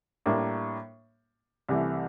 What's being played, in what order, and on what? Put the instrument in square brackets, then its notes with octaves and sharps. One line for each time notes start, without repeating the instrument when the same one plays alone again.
[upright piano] A2 G3 A#3 D4
C2 C3 E3 A3